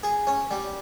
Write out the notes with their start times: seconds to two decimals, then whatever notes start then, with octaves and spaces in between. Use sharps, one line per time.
0.03 G#4
0.27 C#4
0.51 G3